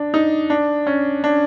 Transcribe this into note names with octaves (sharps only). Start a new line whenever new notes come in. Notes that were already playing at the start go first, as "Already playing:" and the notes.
Already playing: D4
D#4
D4
C#4
D4